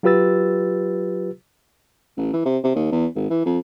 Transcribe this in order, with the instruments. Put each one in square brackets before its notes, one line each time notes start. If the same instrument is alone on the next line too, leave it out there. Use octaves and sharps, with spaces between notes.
[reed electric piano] F#3 F4 G4 B4 E6 A6
[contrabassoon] A1
E3
C3
C3
D#2
E2
G#1
E3
F2